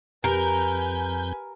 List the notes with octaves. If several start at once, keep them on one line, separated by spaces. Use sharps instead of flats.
F2 G4 A#4 B4 G#5 G6